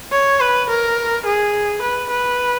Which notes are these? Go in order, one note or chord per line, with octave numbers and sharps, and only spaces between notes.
C#5
B4
A#4
G#4
B4
B4